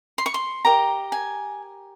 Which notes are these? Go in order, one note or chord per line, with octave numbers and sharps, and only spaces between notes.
C6
C#6
C6
G4 A#4 D#5 A#5
G#5